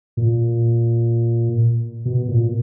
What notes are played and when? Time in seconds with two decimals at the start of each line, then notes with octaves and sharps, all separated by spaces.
0.17 A#2
2.05 B2
2.29 A#2